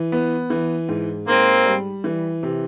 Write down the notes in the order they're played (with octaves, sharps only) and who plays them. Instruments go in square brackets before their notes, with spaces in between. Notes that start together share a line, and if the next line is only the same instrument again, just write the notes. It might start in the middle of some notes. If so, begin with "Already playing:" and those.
Already playing: [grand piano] E3
B3
E3
G#2
[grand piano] G#2 [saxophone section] A#3 C4
[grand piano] G3
E3
C3